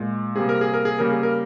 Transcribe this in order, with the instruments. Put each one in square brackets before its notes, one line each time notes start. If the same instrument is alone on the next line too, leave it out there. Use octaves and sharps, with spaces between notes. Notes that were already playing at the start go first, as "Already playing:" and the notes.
Already playing: [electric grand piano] A#2 G#3
C3 G3 A#3 G#4
A#4
G#4
A#4
G#4
C#3 G3 A#3 A#4
G#4
A#4